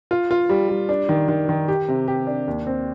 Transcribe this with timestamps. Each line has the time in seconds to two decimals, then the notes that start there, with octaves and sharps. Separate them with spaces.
0.11 F4
0.31 F4
0.49 G3
0.69 G3
0.89 D4
1.09 D#3
1.28 D#3
1.49 D#3
1.68 G4
1.88 C3
2.08 G4
2.27 D4
2.47 D#2
2.67 C4